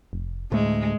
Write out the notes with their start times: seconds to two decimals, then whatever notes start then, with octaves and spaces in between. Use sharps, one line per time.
0.13 F1
0.52 D2 A2 G#3 A3